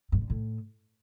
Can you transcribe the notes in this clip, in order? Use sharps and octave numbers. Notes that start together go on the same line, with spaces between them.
G2
D3
A2